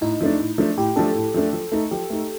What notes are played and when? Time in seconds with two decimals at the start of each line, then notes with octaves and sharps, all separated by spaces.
0.01 A2 D#4
0.21 F3 A3 D4
0.40 A2
0.58 F3 A3 D4
0.77 A2 G4
0.96 F3 A3 D4 A4
1.15 A2
1.34 F3 A3 D4
1.53 F3
1.72 A3 D#4
1.91 F3 G4
2.10 A3 D#4